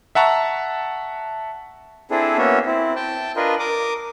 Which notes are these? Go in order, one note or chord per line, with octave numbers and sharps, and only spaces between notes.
E5 F#5 A5 A#5 C#6
C4 D4 E4 G#4 A4
A#3 B3 C#4 F#4 C#5 E5
C4 E4
G5 A5
D4 F4 A#4 B4 D#5
A#4 D6 D#6